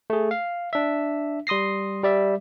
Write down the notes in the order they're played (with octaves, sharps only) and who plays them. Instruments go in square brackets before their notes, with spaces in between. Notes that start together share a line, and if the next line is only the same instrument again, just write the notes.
[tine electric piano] A3 G#4
F5
D4 E5
G3 C6 D#6 A#6 C7
G3 D5 E5